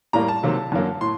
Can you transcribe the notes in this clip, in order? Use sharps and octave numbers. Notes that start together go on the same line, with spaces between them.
A2 G3 A#3 A#5
A5
C3 D#3 F#3 A#3
F#2 D3 F#3 A#3
A2 C6